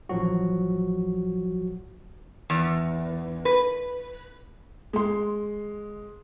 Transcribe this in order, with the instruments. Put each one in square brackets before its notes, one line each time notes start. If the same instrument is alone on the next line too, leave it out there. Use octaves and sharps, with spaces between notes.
[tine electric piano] A1 F3 F#3 F#4
[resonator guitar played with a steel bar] E2
B4
[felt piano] G#3 C6